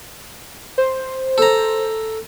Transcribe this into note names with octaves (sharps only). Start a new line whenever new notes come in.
C5
A4 A#5